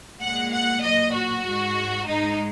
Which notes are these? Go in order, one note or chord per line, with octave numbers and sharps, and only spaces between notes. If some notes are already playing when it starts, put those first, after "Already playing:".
A#2 G#3 F#5
F#5
A#2 F#3 D#5
F#4
G#2 G#3
G#2 G#3 D#4